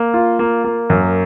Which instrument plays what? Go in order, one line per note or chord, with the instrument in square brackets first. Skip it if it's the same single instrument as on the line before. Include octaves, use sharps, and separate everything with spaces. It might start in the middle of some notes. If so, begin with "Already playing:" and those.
Already playing: [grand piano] A#3
F4
A#3
A#3
F#2